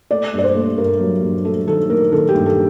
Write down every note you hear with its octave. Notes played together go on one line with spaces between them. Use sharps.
A3 D5
G2 D5
C5
A3
G2 A#4
F#3
G2
A3 A4
D#3 A4
A3 A#4
D#3 A4
G4
G2
A4